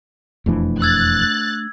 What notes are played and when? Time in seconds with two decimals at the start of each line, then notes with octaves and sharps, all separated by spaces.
0.46 E1 F2 E3 A3 D4
0.82 E6 F#6 G#6 A6